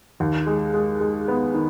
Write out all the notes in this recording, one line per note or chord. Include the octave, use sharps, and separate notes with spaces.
D#2
G#3
G#3
G#3
B3
D#3